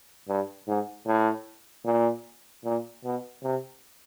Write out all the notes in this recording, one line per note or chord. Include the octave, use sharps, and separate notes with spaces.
G2
G#2
A2
A#2
A#2
B2
C3